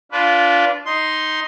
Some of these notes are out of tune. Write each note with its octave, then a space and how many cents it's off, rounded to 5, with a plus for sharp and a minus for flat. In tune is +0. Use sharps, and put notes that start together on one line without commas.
D4 -25 F4 +0 B4 +0
D#4 +5 C6 +0